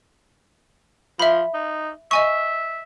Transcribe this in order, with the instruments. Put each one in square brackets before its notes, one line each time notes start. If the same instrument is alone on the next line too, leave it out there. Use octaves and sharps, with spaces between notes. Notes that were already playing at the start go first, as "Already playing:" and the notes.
[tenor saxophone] F3 [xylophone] E5 B5
[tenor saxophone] D#4
[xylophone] D#5 G#5 C#6 [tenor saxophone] E5